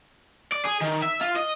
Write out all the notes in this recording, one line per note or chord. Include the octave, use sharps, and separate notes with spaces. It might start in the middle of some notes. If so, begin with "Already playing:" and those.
D5
G#4
D#3
E5
F4
D#5